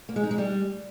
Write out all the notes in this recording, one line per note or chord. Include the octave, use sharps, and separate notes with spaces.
A#3
G#3
D#4
G#3
G3